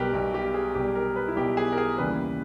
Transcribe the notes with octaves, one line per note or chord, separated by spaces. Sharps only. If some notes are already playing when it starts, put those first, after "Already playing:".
Already playing: B1 B2 G3 G4 A#4 B4
B1 B2 G3
G4
G#4
B1 B2 G3 G4
A#4
B4
E4
B1 B2 G3 G4
G#4
A#4
G#4
D#2 C#3 E3 G3 B4